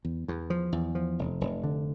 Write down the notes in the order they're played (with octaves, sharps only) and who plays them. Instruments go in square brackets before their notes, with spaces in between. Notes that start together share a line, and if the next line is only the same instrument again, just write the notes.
[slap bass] E2
E2
F3
E2
F3
F1
F1
D3